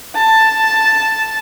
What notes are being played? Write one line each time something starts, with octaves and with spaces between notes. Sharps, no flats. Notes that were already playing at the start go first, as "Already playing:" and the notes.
A5